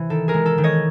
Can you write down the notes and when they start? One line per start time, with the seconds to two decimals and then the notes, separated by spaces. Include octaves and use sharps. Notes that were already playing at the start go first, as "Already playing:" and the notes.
Already playing: C3 E3
0.10 D#3 A4
0.28 G#4 A#4
0.34 G#3
0.46 A4
0.58 D#3
0.64 C#5 D#5